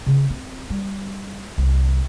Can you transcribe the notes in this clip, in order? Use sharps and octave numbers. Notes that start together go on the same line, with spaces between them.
C#3
C4
G3
C2